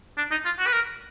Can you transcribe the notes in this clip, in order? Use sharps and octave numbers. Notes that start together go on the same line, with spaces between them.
D4
D#4
F4
F#4
B4
A#4